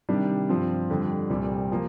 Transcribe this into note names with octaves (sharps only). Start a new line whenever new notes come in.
C3 D#3 G3 D4
G2 F3 C4
F2 D3 G3
C2 A#2 G3 C4
F3 A#3